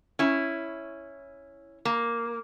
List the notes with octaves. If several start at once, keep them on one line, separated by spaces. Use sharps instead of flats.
C#4 E4
A#3